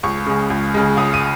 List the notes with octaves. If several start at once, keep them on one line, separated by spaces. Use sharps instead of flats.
C#2 C#6
C#3 G#3
C#2
C#3 G#3
C#2 D#6
D#7